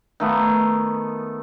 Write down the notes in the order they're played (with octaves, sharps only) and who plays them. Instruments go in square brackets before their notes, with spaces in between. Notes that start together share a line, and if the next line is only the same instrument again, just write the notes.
[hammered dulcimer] D#3 A3 B3